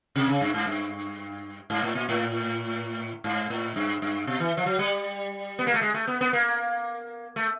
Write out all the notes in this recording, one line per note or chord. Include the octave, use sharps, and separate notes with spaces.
C3
C#3
G2
G#2
G2
G#2
A2
A#2
A2
G#2
A2
G2
G2
B2
E3
F3
F#3
G3
B3
A#3
A3
G#3
A3
B3
B3
A#3
A3